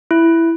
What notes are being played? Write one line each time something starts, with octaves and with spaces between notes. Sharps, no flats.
E4